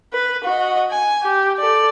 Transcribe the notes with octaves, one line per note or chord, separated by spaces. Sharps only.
B4
F#4 D#5
G#5
G4
A4 D5